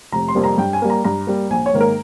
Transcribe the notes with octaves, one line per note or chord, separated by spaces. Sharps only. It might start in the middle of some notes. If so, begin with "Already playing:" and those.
F1 A#5
C6
F2 C3 G3 A#3
A#5
G2 G5
G#5
G3 A#3
A#5
G2 A#5
G3 A#3
A#1 G#5
C#5
G#2 D#3 A#3
A#4